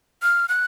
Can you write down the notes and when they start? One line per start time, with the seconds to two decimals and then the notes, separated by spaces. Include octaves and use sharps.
0.23 F6
0.49 F#6